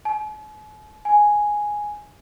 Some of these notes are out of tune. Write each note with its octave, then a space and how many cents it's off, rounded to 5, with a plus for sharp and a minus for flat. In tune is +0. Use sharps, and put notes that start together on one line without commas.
G#5 +45
G#5 +0